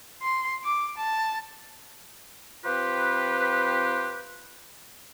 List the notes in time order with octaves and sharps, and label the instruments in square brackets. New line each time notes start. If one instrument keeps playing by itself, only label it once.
[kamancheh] C6
D6
A5
[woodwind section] F3 C4 F4 G4 B4